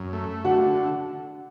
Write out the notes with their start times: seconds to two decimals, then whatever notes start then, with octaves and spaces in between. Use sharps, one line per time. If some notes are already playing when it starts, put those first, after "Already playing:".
Already playing: F#2
0.13 A3
0.44 D3 F#4 F#5